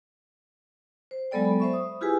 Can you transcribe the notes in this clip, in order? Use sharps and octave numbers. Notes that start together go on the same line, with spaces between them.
C5
F#3 G#3 B3 A4 D5 G5
B5
C5 E5 C#6
D#6
E4 F4 G4 G#4 B4 G#5